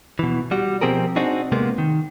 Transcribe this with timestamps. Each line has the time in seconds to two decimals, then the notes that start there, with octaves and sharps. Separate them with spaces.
0.19 B2 E3
0.51 G3 F#4
0.81 B2 F3 C4 G4 G#4 A#4
1.16 C4 D4 D#4 F#4 G#4
1.52 C3 G#3 A#3 B3
1.78 D#3